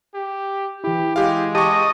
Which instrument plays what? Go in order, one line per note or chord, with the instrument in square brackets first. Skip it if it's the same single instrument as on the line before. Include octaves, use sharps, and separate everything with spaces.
[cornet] G4
[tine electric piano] E3 E4 [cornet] G4
[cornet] G#3 [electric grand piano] G4 F5
[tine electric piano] G4 [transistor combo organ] D#5 [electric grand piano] A5 C#6